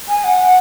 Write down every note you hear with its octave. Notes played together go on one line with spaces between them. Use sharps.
G#5
F#5